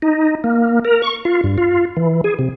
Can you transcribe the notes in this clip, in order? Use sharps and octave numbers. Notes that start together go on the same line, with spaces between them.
D#4
A#3
A#4
C#6
F4
G2
F4
E3
G#4
C3